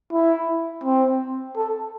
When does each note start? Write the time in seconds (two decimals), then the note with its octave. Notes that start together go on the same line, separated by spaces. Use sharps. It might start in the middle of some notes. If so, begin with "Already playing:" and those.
0.13 E4
0.84 C4
1.57 A4